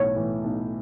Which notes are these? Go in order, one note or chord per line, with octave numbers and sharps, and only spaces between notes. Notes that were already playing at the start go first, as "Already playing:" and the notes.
Already playing: B1 A2 E3 C#5
A2 E3
B1